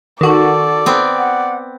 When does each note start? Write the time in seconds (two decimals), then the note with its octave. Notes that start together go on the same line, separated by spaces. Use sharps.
0.21 D#3 F#4 A4 D5
0.86 B3 C4
1.18 F#5